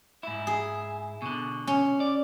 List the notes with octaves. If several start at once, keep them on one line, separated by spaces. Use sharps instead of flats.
G#2 E4
G#4
B2 D3
C#4
D5